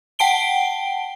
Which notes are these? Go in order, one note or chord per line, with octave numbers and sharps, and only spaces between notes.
F#5 G5 A5 D7 G7